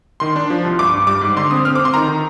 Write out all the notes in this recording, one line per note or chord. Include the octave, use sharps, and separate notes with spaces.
D#3 C6
D4
F3
C2
G2 D6
G2
G3 D6
G#2
D3 C6
C4 D#6
C4 F6
C4 D6
C6
D#3 A#5
D#3